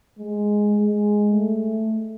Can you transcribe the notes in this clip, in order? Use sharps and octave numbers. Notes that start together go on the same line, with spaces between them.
G#3
G#3
A3